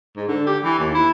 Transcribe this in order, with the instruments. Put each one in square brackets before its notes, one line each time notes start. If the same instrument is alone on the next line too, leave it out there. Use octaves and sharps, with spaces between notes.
[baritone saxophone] G#2
D3
G4
E3
D#2
E4